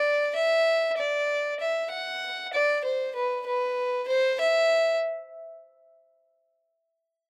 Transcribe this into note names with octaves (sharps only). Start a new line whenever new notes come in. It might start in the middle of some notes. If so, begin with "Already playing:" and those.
Already playing: D5
E5
D5
E5
F#5
D5
C5
B4
B4
C5
E5